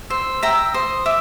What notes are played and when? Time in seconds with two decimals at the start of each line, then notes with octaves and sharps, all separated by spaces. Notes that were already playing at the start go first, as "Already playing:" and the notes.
0.10 C5 E6
0.42 E5 G5 A#5
0.73 C5 D#6
1.06 E5 D6